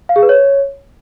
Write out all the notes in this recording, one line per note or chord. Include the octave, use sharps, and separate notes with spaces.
F5
G#4
B4
C#5